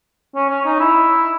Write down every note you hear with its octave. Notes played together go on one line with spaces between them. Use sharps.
C#4
C#4
D#4
E4